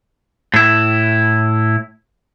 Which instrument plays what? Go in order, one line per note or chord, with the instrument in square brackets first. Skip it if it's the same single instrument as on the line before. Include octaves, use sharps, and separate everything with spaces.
[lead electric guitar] A2 E4